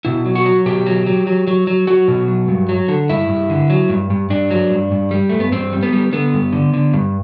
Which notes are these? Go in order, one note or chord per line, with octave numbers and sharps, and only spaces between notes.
B2 E4
F#3
F#4
F#3
B2 G4
F#3
F#3
F#3
F#3
F#3
F#3 F#4
B2
F#3
G2
F#3
D3
G2 E4
G2
D3
F#3
G2
G2
G2 D4
F#3
G2
G2
G3
G2 A3
B3
G2 C4
G3
B3
G3
D3 B3
G2
D3
D3
G2